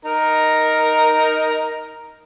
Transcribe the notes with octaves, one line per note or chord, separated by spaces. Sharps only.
D#4 A#4 A#5